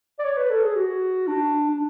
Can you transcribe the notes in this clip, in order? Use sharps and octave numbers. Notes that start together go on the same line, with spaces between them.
D5
C#5
B4
A4
G#4
F#4
D4
D4